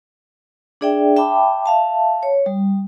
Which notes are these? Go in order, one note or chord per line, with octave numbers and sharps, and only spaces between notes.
D4 G#4 D5 E5 G5
E5 G5 A5 B5 D6
E5 F5 A5
C#5
G3